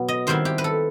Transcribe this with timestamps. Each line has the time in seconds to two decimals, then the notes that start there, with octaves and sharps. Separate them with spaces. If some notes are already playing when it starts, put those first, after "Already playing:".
Already playing: B2 F#3 B3
0.08 D#5
0.27 D#3 G3 C4 E4 C5
0.45 G4
0.58 B4
0.64 A4